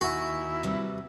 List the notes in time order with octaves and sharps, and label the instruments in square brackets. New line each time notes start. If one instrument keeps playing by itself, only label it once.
[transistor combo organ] D#2 [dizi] E4 [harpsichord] F#4 [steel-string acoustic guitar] G#5
[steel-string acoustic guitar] C3 G3 B4